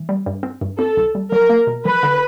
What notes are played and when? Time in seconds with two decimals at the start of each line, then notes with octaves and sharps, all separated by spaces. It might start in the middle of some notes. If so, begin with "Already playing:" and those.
Already playing: E3
0.09 G3
0.26 G2
0.43 C4
0.61 G2
0.79 C4 A4
0.97 C2
1.15 G3
1.32 F#3 A#4
1.49 A#3
1.67 B2
1.85 F3 B4
2.03 D3